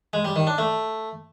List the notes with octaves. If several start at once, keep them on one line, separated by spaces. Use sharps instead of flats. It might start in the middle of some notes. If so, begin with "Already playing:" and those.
G#3
G3
D#3
D4
A3